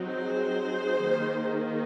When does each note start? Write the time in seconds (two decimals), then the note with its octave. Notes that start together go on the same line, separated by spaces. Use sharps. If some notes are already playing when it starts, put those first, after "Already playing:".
Already playing: F#3 C4 D#4
0.09 G#4 C5
1.02 D#3 A#3 D#4